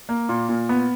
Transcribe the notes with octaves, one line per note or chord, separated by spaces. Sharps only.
A#3
A#2
A#2
B3